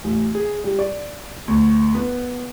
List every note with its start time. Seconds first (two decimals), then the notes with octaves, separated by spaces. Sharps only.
0.04 A1
0.35 G#4
0.64 G3
0.79 D5
1.48 D2
1.94 B3